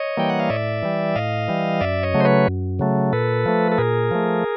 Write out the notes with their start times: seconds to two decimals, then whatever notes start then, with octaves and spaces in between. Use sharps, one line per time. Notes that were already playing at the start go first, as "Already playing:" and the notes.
Already playing: C#5 D#5
0.17 E3 G3 A#3 G5
0.30 F#5
0.40 F5
0.50 A2 D5 E5
0.83 E3 G3
1.16 A2 D#5 F5
1.48 E3 G3
1.81 F#2 D5 E5
2.03 C#5 D#5
2.14 C#3 F#3 A3
2.20 C5
2.25 B4 C#5
2.47 F#2
2.79 C#3 F#3 A3
3.13 A#2 A4 B4
3.46 F3 A3
3.72 A4
3.78 A#2 G#4 A#4
4.11 F3 A3